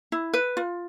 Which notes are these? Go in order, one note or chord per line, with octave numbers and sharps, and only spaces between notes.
E4
B4
F4